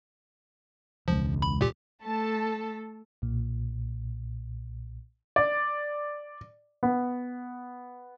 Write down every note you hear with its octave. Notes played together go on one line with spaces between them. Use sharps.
E1 C#2 F3
B5
A#2 G4
A3 A4 A5
B1 A#2
D5
B3